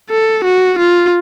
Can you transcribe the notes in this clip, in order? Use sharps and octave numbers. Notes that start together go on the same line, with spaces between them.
A4
F#4
F4